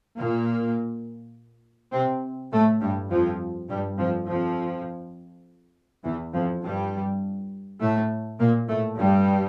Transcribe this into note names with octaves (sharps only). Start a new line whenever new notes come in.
A#2 A#3
C3 C4
A2 A3
G2 G3
F2 F3
G2 G3
F2 F3
F2 F3
E2 E3
F2 F3
G2 G3
A2 A3
A#2 A#3
A2 A3
G2 G3